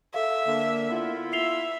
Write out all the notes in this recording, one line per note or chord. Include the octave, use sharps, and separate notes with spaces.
A4 E5 F5
D3 A#3
B3 E4 F4
E5 C7 F7 G7